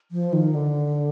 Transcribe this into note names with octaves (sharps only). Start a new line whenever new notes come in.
F3
D#3
D3